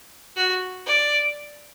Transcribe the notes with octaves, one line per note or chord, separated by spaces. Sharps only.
F#4
D5